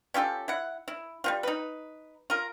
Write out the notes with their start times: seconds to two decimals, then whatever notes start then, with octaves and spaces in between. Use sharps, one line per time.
0.14 C#4 F4 G4 A4
0.48 E4 F#5
0.88 E4
1.24 G3 C4 F4
1.43 D#4 B4
2.30 F4 A#4